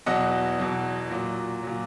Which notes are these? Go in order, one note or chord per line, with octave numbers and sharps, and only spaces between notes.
E2 B2 F#3 D#5 F#5
E2 B2 F#3
A#2 F#3
A#2 F#3